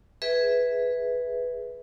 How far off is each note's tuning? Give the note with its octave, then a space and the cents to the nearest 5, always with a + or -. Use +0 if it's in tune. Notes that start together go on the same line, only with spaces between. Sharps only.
G#4 +0 B4 +0 E5 -10